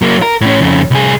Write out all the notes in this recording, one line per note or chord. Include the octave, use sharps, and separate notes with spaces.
F#3 A#3
A#4
A2 C#4
F2 C#3
C2 G#4